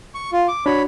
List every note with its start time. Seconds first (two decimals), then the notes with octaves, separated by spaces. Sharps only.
0.14 C#6
0.32 F4
0.48 D6
0.66 D4 F#4 C#5 B5